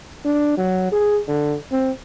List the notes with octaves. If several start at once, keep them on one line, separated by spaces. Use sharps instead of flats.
D4
F#3
G#4
D3
C4